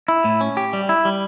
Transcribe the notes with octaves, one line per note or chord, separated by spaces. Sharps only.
E4
A2
C#4
G4
G3
E4
G3